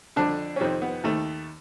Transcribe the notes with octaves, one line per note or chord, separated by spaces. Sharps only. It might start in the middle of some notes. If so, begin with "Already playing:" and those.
F2 D3 D4
C#4
F2 C3 D#3 C4
B3
D#2 D#3 A3